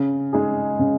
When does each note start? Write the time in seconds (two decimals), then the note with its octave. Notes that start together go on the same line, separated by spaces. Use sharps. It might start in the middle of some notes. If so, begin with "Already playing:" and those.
Already playing: C#3
0.33 G#3 D#4 G#4
0.79 C#3